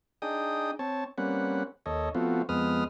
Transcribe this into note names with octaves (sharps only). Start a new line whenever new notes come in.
D4 D#4 G#4 G5 D#6
C4 C#5 A5
G3 A#3 C4 C#4 B4 F#5
D#2 A4 C#5 D#5
F3 A3 B3 C4 F4 F#4
F2 G#3 B3 B4 D#6 F6